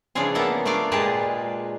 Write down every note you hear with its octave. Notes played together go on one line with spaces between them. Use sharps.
C#3 E3 F3 D4 F4 G#4
A#3 B3 A4 E5 F#5
A3 A#3 D4 F4 D5
A#2 G#3 G4 G#4 B4 A5